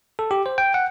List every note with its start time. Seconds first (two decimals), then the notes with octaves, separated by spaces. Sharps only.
0.19 A4
0.31 G4
0.46 C5
0.58 G5
0.74 F#5